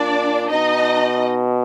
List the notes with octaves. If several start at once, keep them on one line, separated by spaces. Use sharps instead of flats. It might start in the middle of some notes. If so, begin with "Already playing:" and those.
Already playing: A#2 D4 D5
B2 D#4 D#5